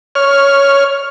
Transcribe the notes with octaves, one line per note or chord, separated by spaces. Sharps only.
C#5 F6